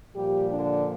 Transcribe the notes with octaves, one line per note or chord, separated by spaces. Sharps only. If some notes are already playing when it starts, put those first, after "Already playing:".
A#2 F3 G3 G4
D3 D4